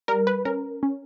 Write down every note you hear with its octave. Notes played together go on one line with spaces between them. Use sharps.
G3 A#4
B4
C#4 A#4
C#4